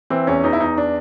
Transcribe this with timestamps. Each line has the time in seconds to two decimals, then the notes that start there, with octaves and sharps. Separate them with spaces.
0.10 E3 C4
0.27 E2 C#4
0.44 E2 D#4
0.53 E4
0.60 E2 D#4
0.78 D4